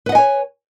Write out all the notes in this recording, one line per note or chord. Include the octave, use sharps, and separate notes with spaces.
B4 C#5 D#5 F#5 G#5